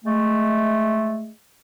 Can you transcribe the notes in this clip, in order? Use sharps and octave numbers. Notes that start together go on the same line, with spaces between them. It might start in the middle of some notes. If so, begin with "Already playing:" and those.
G#3 A3